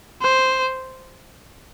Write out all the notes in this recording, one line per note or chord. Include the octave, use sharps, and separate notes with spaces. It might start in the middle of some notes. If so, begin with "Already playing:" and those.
C5